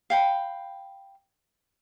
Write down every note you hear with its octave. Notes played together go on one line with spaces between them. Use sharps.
F5 G5 B5